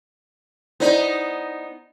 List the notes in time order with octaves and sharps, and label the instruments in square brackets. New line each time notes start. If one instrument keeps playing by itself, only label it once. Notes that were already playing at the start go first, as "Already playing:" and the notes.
[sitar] B3 D#4 [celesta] E4 C5 D5